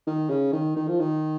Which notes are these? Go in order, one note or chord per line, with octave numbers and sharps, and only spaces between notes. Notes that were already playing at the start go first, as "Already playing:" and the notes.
D#3
C#3
D#3
D#3
F3
D#3